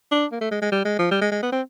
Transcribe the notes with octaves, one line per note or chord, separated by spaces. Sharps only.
D4
A#3
A3
G#3
G#3
G3
G#3
F3
G3
G#3
G#3
B3
C4